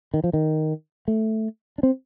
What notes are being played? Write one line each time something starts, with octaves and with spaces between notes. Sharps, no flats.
D#3
F3
D#3
A3
D4
C4